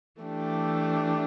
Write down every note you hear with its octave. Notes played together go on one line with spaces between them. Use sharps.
E3 A3 D4 G4